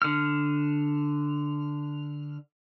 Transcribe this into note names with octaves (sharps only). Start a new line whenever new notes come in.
D3 F6